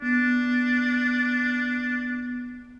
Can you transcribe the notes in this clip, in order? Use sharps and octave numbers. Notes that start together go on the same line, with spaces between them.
B3 D4